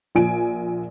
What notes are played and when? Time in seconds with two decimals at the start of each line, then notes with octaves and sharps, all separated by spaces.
0.15 A#1 A#2 G#5 D7